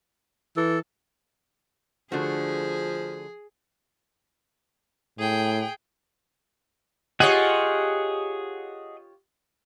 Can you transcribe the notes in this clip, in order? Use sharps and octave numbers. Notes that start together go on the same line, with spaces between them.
E3 A4
D3 F3 A3 F#4 G#4
A2 G#4 G5
F4 G4 G#4 C#5 D#5 F#5